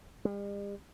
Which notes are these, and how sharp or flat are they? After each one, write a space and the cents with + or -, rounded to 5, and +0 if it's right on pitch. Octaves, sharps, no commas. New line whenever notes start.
G3 +45